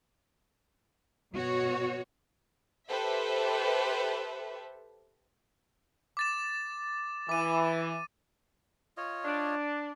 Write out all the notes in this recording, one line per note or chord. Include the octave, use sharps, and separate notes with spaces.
B2 F#4 C#5
G4 A4 B4 C5 E5
D6 A6 E7
E3 D6 D#7
F4 C#5 D#5
D4